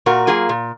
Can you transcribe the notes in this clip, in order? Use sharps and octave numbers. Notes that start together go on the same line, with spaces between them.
A#2 F#4 A#4
F#3 A#3 F4 G#4
A#2